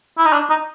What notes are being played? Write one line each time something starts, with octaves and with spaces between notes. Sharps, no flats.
E4
D#4
D4
D#4